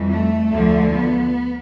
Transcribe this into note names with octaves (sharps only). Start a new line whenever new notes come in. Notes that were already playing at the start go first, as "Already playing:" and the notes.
Already playing: F2 E3 G3
A3
D2 D3 F3
B3